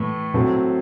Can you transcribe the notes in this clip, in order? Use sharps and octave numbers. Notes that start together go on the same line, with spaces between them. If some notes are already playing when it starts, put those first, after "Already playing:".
Already playing: A2 E3 A3
A2 F#3 C4